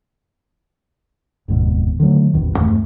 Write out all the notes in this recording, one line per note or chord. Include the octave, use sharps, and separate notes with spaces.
F1 D#2 G#2 B2
D3 D#3 F#3 A3
D#1 A1 E2 D#3
E2 G2 A3